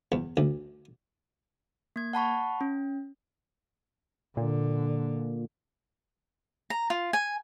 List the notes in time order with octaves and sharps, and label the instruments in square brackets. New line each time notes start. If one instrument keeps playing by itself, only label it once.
[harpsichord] E2
D2
[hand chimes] A#3 G#6
F#5 A5 B5 C#6
C#4
[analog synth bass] A#2 [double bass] D3
[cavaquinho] A#5
F4
G#5